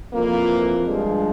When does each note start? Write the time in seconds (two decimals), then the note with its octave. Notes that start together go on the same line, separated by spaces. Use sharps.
0.13 F2 E3 A#3
0.85 G2 F3 G#3